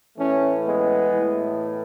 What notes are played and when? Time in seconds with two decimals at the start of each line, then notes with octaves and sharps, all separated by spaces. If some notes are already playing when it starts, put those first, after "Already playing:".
0.18 A2 E3 A3 C#4
0.65 G#3 B3
1.13 A2 E3